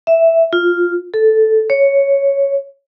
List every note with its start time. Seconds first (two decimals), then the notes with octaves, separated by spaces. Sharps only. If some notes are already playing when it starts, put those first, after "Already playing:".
0.07 E5
0.53 F4
1.14 A4
1.70 C#5